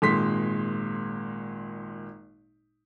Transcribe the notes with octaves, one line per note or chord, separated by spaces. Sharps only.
G#1 A#2 G#3 C6 B6